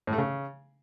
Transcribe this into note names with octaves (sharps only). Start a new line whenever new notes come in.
A2
A3
C#3